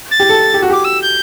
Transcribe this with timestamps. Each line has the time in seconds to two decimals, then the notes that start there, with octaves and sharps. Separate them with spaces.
0.11 A6
0.20 G4
0.29 A4
0.54 G4
0.62 F#4
0.70 G4 D6
0.84 E6
1.02 G6